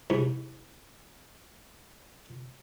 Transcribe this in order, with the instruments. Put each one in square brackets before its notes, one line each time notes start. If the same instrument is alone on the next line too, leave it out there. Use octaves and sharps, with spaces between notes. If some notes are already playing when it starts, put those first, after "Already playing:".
[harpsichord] C2 G#2